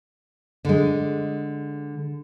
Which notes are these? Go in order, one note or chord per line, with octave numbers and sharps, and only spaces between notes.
D3 G#3